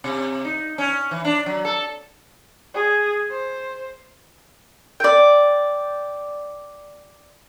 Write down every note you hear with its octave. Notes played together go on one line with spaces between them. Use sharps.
C3
D#4
C#4
E3
D4
F#3
A4
G#4
C5
D5 G5